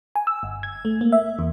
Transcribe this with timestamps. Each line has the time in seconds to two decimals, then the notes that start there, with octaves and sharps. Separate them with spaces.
0.16 G#5
0.27 E6
0.43 G1
0.63 G#6
0.85 A3
1.01 A#3
1.12 E5
1.39 E2